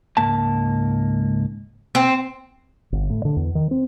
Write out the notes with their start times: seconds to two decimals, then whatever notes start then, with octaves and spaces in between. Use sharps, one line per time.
0.17 C#2 G#2 A#3 A5
1.95 C4
2.92 G1
3.10 A2
3.25 D3
3.37 E2
3.55 D#3
3.71 C4